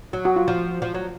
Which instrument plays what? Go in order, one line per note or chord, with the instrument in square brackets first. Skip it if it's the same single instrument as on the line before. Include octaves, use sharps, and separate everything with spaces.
[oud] F#3
[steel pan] F#4
F4
[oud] F3
F3
F#3